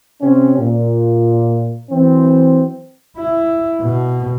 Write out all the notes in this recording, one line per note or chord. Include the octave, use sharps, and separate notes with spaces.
C3 C4 C#4
A#2
E3 F#3 C4
E4
B2